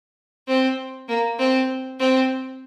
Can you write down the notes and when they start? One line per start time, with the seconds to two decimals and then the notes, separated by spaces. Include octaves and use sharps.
0.47 C4
1.08 A#3
1.38 C4
1.99 C4